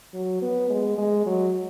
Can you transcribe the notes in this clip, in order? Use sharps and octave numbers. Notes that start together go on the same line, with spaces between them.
F#3
B3
G#3
G#3
F#3